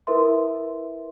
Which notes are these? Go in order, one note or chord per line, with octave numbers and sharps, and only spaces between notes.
E4 A#4 B4 E5 C6